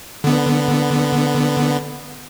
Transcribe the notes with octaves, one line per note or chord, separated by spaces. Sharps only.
D3 B3